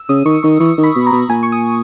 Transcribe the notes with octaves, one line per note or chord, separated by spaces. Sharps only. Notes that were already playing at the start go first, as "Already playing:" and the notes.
Already playing: E6
C#3 D#6
D#3 C#6
D#3 C#6
E3 C#6
D#3
B5
B2
A#5
B2
A#2 G#5
C#6
D#6